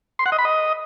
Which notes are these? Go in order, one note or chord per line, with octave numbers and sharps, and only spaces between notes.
C6
F#5
D#5
B5
D#5